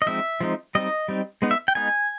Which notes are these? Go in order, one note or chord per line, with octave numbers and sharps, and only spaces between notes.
D#5
F3 G#3 C4 D#4 E5
F3 G#3 C4 D#4
G3 C4 D#4 D#5
G3 C4 D#4
G#3 B3 D#4
E5
G5
G#3 B3 D#4 G#5